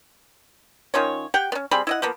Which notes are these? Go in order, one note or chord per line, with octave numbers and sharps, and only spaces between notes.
D#3 C#4 F4 C#5
G4 F#5 G5
B3 C#4
G3 C4 G#4 B5
E4 D#5 F#5
F3 A#3 B3